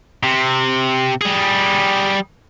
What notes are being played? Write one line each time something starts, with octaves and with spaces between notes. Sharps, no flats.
C3
G3 G#4